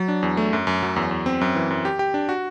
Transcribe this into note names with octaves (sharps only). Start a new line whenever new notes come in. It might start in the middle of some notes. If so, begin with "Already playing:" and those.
Already playing: F#3
D4
E2
A3
F#2
F#2
F#3
E2
E2
C4
F#2
E3
F#2
G4
G4
D4
F#4